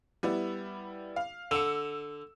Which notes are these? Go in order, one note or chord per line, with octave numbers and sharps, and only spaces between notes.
G3 B3 E4
F5
D3 E6 C#7